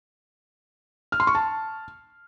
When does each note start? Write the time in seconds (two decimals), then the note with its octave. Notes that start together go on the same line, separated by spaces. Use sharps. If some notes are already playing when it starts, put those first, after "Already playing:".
1.12 F6
1.20 C6
1.27 C#6
1.35 A5